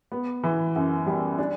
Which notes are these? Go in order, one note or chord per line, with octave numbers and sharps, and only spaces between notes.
B3
E3
F#2
G3
D4